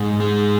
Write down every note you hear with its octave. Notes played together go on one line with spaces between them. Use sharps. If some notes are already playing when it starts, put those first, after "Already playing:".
Already playing: G#2
G#3